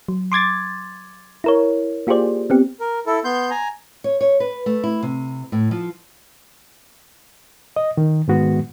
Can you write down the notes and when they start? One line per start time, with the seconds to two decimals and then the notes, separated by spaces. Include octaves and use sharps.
0.08 F#3
0.32 C6 D6 G#6 A6
1.44 E4 A#4 C#5
2.07 A#3 F4 G4 G#4 C5 D5
2.50 B3 C4 G4
2.80 A#4
3.06 E4 A4
3.25 B3 C6 G6
3.50 G#5 A#5
4.04 C#5
4.21 C#5
4.40 B4
4.66 A3
4.84 E4
5.03 C3
5.52 A2
5.71 F3
7.76 D#5
7.97 D#3
8.28 G#2 D#3 G#3 B3 F#4